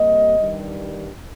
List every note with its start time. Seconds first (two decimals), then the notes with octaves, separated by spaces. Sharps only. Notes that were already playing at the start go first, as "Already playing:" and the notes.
Already playing: C3 G3 A#3 D#5
0.40 G2 D#3 G3